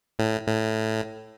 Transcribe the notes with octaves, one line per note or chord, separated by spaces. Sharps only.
A2
A2